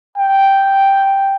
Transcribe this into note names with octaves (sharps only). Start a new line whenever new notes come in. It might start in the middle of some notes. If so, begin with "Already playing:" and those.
G5